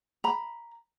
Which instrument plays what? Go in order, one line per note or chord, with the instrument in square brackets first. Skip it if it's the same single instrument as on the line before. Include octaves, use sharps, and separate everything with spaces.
[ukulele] A#5 B5